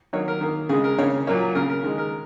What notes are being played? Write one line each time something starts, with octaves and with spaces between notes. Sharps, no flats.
D#3 F#3 A#3 C#5
A#4
D#3 A#3
C#3 G#3 G#4
A#4
C#3 A#3 C#5
A#2 F#3 A#3 C#5
C#3 A#3 A#4
A#4
D#3 G#3 A#4
A#4